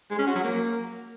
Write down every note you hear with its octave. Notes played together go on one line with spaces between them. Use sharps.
G#3
C#4
F#4
F#3
A#3